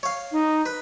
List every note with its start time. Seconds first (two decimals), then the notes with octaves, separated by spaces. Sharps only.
0.03 C#5 F5
0.32 D#4
0.66 B4